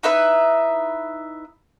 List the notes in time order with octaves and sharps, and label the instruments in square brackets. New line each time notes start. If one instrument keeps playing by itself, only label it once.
[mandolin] D#4 E4 B4 E5